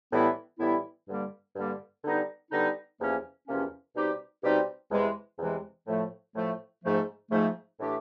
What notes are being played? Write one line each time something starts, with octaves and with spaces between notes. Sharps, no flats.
A2 E3 G3 B3 E4
A2 E3 G3 B3 E4
G2 D3 G3 A#3
G2 D3 G3 A#3
D3 G3 B3 D#4
D3 G3 B3 D#4
E2 C3 F3 A#3 C#4
E2 C3 F3 A#3 C#4
B2 G3 C4 D#4 G4
B2 G3 C4 D#4 G4
E2 C3 E3 G#3
E2 C3 E3 G#3
A2 F3 A3
A2 F3 A3
G#2 F3 A3
G#2 F3 A3
A2 E3 A3 D4 G4